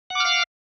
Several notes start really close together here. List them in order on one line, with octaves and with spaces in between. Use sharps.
F#5 D6 F6 F5